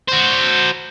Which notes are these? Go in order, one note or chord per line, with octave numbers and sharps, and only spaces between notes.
F#4 C5